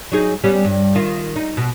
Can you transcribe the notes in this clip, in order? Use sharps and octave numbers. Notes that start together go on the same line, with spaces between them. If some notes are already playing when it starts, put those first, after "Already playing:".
F#3 D#4 G#4
G3 B3 C#4
G2
D#3 F4
D#4
B2